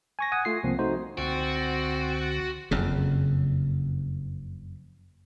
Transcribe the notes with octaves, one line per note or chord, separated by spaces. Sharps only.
G#5 C#6 A#6
F#5 G#5 D#6
A3 F4 C7
C2 F3 A#3 C4
A3 D#4 F#4 C5
C#2 D3 C4 F#4
F#1 F2 C#3